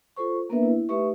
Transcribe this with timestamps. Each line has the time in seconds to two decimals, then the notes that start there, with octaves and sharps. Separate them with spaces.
0.16 F4 A4 C5 C#6
0.49 A#3 B3 D4 A#4 B4 E5
0.63 E4
0.89 A3 D#4 G4 B4 E5 C#6